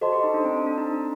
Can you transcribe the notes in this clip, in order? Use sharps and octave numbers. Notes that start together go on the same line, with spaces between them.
F#4 A4 C5 D#5 A5 C6
G4
D#4
D4
C4
D4
D4
D#4